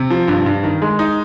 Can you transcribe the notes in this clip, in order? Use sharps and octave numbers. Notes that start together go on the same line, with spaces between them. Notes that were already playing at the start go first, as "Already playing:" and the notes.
Already playing: C3
F3
G2
G2
D#3
G#3
D#4